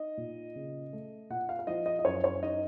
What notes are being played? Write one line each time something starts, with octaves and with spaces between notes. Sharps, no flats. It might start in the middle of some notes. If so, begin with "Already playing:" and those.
Already playing: D#4 D#5
A#2
C#3
A3
A#2 F#5
F5
F5
F3 D#5
D#5
D#5
F#2 C#5
C#5
D#4 D#5